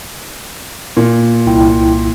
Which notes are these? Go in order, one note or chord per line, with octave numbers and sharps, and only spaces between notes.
A#2
C2 E4 G5